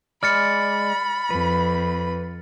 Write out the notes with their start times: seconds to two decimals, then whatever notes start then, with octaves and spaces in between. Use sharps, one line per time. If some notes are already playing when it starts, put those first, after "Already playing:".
0.23 G#3 D5 B5 F6 A6 C#7
1.31 F2 B4